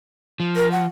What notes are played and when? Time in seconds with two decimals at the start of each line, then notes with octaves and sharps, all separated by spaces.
0.40 F3
0.56 A#4
0.72 F#5